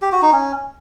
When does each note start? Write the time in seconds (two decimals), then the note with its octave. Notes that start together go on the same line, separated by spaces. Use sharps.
0.02 G4
0.12 F#4
0.22 D#4
0.32 C#4